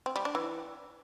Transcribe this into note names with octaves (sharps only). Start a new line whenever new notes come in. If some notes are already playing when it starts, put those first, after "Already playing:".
C4
G3
D4
E3